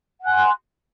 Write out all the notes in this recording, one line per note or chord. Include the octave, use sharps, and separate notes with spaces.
F#5 G#5 C6 F#6